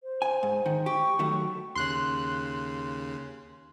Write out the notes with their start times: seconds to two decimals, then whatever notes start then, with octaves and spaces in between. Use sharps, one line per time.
0.03 C5
0.22 G#5
0.43 G#2
0.66 D#3
0.86 G4 C#6
1.19 D#3 F#3 A3
1.75 D#2 C#3 C6 F#6